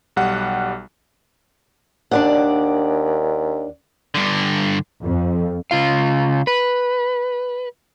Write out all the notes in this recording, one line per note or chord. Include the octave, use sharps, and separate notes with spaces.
B1 G3 F#5
D#2 D4 D5 F#5
G2 D3
F2
C#3 F4 F5
B4